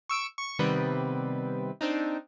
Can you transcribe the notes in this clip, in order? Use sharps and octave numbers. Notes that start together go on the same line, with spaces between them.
C#6 E6 D7
C#6
C3 D#3 G3 B3 C4 B4
C4 D4 D#4